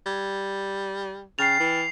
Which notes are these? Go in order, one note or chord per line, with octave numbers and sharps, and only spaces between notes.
G3 G#6
C#3 G5 F6 A6 C7 F7
E3